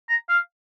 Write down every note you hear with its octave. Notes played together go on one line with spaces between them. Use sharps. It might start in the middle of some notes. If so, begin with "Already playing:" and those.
A#5
F5